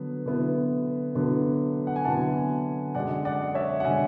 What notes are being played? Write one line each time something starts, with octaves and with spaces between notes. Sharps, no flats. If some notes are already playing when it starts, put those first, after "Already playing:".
Already playing: D3 F#3 B3
D3 F#3 B3 E4
D3 F#3 B3 E4
F#5
G#5
D3 F#3 B3 E4 F#5 A5
F#2 D3 G#3 D5 F#5
D5 F#5
C#5 E5
F#5
D3 G#3 E5 G#5